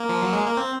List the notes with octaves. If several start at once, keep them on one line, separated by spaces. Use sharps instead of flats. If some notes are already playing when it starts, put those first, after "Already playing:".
Already playing: A#3
F3
F#3
G#3
A#3
C4